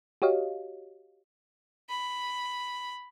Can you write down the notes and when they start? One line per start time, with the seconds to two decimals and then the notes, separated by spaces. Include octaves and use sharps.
0.22 F#4 G4 C#5 D#5 F5
1.90 B5